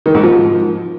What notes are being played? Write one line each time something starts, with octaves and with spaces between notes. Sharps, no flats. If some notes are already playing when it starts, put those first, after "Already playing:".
D#3
G#2
F3